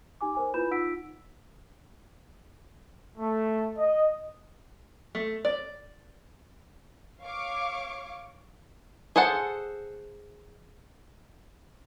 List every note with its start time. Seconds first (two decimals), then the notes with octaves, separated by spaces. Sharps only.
0.21 D#4 G4 G#5 D6
0.35 A#4 C5 G#5
0.54 E4 F4 B4 B5 G6 E7
0.71 D#4 F4 F#5 E6 B6 D7
3.18 A3
3.78 D#5
5.15 A3
5.45 D5
7.20 C#5 F5 C#6 D6
9.16 G#4 A4 C5 F#5